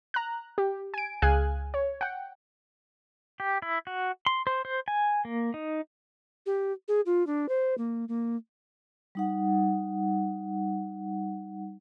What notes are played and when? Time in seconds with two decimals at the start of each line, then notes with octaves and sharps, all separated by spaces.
0.14 A#5 F#6
0.58 G4
0.94 G#5 D7
1.22 C#2 G#4 F5 G#5 F#6
1.74 C#5
2.01 F#5 G5
3.40 G4
3.62 E4
3.87 F#4
4.26 C6
4.47 C5
4.65 C5
4.88 G#5
5.25 A#3
5.54 D#4
6.46 G4
6.88 G#4
7.06 F4
7.27 D4
7.49 C5
7.78 A#3
8.08 A#3
9.15 G3 D#4 F#5